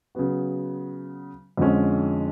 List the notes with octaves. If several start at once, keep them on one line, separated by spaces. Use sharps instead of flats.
C#3 F#3 B3 F#4
F2 D3 F3 G#3 C#4